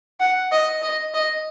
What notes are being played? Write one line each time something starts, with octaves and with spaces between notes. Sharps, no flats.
F#5
D#5
D#5
D#5